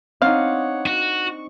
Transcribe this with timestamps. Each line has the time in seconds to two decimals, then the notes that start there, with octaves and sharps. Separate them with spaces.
0.22 C4 D4 D#4 C#5 F5 F#5
0.86 F#4 C#6